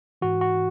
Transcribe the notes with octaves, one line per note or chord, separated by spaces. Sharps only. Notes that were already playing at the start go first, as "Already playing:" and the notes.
G#2 E3 F#4
F#4